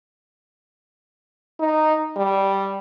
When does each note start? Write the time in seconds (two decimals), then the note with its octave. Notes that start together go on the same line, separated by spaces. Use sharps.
1.60 D#4
2.17 G3